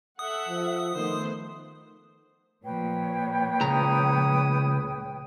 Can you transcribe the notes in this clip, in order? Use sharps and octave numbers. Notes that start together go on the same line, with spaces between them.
A4 E5 F#5 D#6
F3
D#3 A3 B3 C5
A#2 F3 B4 C#5 G5
C#2 A#5 D#6